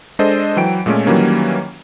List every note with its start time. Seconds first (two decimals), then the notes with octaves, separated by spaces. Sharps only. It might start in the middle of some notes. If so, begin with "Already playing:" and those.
0.19 G#3 D4 A4 C5 D#5
0.56 E3 F#3 G5 D7
0.86 A#2 G#3 A3 C#4
1.06 D#3 E3 F#3 G3 A#3 C#4